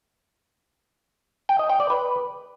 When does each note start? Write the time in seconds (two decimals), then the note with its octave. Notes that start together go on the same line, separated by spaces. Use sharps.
1.49 G5
1.59 D#5
1.70 G5
1.80 D5
1.90 B4